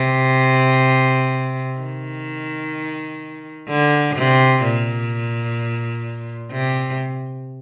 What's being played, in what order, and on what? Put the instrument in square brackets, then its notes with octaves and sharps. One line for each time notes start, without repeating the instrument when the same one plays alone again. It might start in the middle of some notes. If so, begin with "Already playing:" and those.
Already playing: [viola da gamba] C3
D#3
D3
C3
A#2
C3